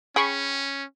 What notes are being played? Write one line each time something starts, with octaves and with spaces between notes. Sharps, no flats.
C#4 G#4 G5 B5 C#6